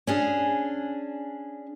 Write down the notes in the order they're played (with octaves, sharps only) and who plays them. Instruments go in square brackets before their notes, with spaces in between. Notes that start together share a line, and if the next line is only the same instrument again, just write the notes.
[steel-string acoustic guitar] C#4 D4 G#4